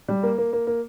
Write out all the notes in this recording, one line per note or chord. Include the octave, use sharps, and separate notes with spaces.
G3
A#3
A#3
A#3
A#3